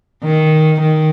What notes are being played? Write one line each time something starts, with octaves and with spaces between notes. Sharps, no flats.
D#3
D#3